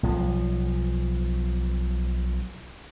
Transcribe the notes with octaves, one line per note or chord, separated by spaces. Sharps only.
B1 F3